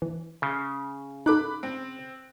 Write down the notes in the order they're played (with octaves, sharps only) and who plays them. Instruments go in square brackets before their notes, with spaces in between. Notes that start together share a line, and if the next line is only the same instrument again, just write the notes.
[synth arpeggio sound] E3
[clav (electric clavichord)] C#3
[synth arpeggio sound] D#4 A4 [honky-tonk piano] B5 D6 F#6
[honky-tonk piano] C4